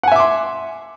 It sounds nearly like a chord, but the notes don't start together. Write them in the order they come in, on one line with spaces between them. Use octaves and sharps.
F#5 G#5 E5 D6 C6